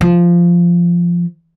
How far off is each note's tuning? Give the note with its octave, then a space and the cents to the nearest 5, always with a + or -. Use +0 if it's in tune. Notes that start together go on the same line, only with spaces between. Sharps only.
F3 -10